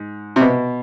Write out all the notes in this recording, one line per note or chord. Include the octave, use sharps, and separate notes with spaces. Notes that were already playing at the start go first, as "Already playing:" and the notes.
Already playing: G#2
C3
B2